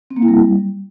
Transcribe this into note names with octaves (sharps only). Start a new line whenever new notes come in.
C4
A#3
E4
G3